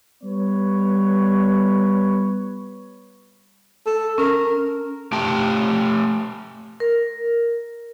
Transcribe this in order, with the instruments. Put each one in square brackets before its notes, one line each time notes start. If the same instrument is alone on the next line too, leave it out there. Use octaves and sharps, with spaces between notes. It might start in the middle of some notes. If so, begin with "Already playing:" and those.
[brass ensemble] G3 B3 B4 C#5
[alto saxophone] A4
[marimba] C#4 [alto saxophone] A#4
[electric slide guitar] A3 G4 G5 A5
[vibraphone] A#4